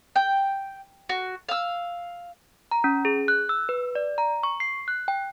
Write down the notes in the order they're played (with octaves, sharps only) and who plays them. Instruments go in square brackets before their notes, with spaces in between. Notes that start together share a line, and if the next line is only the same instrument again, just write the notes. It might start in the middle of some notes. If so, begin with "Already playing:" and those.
[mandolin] G5
F#4
F5 E6
[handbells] A#5
C#4
G#4
F#6
E6
B4
D5
A#5
C#6
C7
F#6
G5